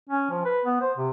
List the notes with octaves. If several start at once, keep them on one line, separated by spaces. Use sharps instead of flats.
C#4
F3
B4
B3
C5
C3